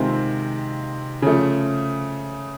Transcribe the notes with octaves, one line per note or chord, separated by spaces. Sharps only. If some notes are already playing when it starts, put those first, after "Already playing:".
Already playing: C3 D#3 G#3 C4 F4
C#3 F3 A3